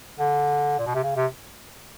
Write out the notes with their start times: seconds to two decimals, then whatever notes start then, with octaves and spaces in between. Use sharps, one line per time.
0.20 D3
0.79 A#2
0.86 B2
0.95 C3
1.03 C#3
1.16 C3